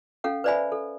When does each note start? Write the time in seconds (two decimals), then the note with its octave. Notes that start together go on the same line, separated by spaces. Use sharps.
0.24 C#4 A4 F5 F#5
0.44 B4 C5 D5 E5 G#5 B5
0.72 A4